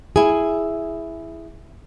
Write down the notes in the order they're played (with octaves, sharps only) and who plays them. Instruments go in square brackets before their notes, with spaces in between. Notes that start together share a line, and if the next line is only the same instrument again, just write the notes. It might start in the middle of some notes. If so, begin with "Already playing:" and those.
[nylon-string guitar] E4 G#4